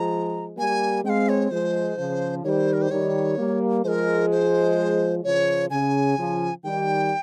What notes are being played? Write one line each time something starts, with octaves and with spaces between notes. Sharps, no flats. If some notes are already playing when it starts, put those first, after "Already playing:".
Already playing: F3 G#3 A#5
G3 A#3 G#5
G#3 C4 F5 G5
C#5
F3 G#3 C5
C#3 F3
D#3 G3 C5 C#5
A#4
C5
D#3 G3 C#5
G3 A#3
F3 G#3 A#4 C5
C5
C#3 F3 C#5
C#3 G#5
C#3 F3
D#3 G3 G5